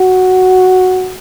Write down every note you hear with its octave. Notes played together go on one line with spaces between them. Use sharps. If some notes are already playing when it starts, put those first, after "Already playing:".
Already playing: F#4